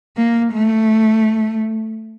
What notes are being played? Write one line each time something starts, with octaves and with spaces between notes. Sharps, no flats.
A#3
A3